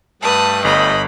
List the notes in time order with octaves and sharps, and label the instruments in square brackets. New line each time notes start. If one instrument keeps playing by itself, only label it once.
[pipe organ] G2 A3 [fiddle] B4 D#6 [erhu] A5
[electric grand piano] G1 [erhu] D#5 [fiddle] B5